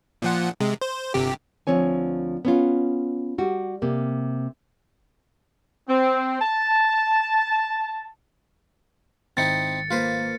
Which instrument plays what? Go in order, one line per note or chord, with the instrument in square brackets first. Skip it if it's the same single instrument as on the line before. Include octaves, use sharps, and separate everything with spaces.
[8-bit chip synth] A#2 F3 F#5
C3 G#3
C5
G1 C3 G4
[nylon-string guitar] D2 F3 C4 C#5 G#5
B3 C#4 F4
G3 F#4
C3 A#3
[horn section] C4
A5
[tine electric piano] G#1 [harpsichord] C4 D#4 E4 [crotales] A6 C#7
[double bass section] A#3 [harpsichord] F4 B4 C5